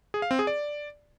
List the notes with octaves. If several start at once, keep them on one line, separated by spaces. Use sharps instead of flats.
G#4
F5
C4
G#4
D5